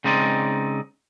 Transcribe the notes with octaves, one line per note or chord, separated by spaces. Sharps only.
C#3 G#3 C4 D#4 D5